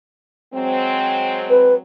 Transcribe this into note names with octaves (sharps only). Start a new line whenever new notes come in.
F#3 G#3 C4
B4